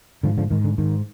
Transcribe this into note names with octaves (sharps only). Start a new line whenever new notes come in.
G#2 D3 F3
D3 F3
G#2 D#3
D3
G#2 D#3